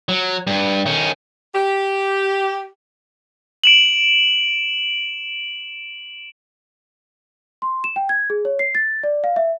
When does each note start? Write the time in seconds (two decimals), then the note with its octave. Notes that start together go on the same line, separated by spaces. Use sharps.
0.09 F#3
0.47 G2
0.86 D#3 C#4
1.55 G4
3.64 D7 E7 F#7
7.62 C6
7.84 E7
7.96 G5
8.09 G#6
8.30 G#4
8.45 C#5
8.59 C7
8.75 A6
9.03 D5
9.24 F5
9.36 E5